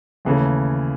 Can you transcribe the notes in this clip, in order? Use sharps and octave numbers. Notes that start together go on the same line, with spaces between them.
D#2 C#3 E3 A3